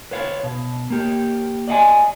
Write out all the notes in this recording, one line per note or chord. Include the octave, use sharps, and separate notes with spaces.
B4 C#5 F5
B2
A#3 G4
D5 D#5 F5 G#5